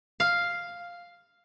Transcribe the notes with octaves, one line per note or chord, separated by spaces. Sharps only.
F5